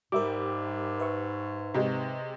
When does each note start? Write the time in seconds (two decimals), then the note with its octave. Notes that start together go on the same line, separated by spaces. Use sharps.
0.12 G#2 G3 A#4 E5 D6
1.00 B4 E5 C#6
1.74 C3 G#3